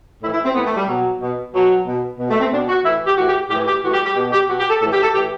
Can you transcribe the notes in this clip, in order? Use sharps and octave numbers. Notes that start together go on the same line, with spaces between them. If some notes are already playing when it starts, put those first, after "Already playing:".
A2 E3 E4
E4
C4
A2 E3 B3
A3
G3
B2 F#3
B2
B2 F#3
B2
B2
A3
C4
B2 D4
F#4
A2 E3 E4
G4
A2 E3 F#4
G4
A2 G4
E3
G4
A2 E3 F#4
G4
G4
B2 G4
G4
B2 F#4
G4
A4
A2 E3 A4
G4
A4
A2 E3 G4